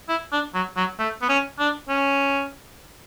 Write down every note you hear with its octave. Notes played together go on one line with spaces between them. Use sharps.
E4
D4
F#3
F#3
A3
B3
C#4
D4
C#4